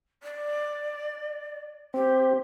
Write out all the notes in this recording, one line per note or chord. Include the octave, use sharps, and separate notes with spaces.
D5
C4 G4